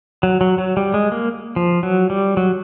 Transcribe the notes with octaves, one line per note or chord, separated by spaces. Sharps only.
F#3
F#3
F#3
G3
G#3
A#3
F3
F#3
G3
F#3